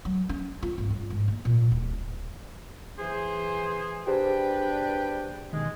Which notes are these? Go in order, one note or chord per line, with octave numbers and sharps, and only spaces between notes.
F#3
C#4
F4
G#1
G2
G#2
A#3
A#2
D1
E3 G#4 C5
D4 G4 G#4 B4 C5 G5
B2 D#3 G#3